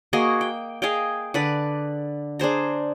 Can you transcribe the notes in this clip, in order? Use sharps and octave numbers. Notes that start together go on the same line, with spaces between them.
A#3 F#4 G#4 D#5
G5
G#4 D#5 F5 G5
D3 B4 D5
D4 G#4 C5 A#5